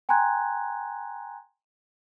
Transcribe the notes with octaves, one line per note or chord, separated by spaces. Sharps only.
G5 G#5 A#5 C6 F#6 G#6